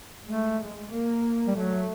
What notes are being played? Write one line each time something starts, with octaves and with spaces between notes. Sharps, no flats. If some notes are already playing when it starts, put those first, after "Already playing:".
G#3 A3
G#3
A#3
G3
F#3 A3